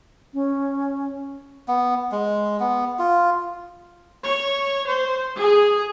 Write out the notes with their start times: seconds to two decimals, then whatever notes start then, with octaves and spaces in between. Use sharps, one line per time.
0.34 C#4
1.68 B3
2.12 G#3
2.60 B3
2.99 F4
4.25 C#5
4.89 C5
5.37 G#4